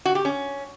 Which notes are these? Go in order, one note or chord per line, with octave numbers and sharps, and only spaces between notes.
F#4
G4
C#4